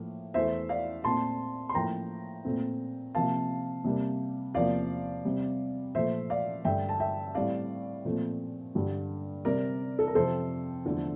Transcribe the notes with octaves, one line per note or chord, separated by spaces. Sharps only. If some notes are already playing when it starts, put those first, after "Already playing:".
Already playing: A2 F3 A#3
E2 E3 A3 C5 E5
D5 F5
A#2 A3 C4 A5 C6
C6
A2 F3 A#3 G5 A#5
A#2 A3 C4
C3 F3 A#3 F5 A5
C3 G3 A#3
E2 C3 F3 A#3 D5 F5
C3 G3 C4
A#2 F3 A3 C5 E5
D5 F5
G2 D3 A3 E5 G5
A5
E5 G5
A2 G3 C4 D5 F5
A#2 F3 A3 C4
G2 D3 G3
C3 G3 C4 A#4 D5
A4
A#4
F2 C3 F3 A4 C5
E2 D3 F3 A3